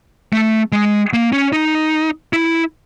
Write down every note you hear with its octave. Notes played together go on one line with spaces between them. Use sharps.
A3
G#3
A#3
C#4
D#4
E4